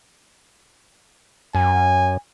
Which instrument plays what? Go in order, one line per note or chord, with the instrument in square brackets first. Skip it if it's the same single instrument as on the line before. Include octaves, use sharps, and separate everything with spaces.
[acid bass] F#2 [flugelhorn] G#5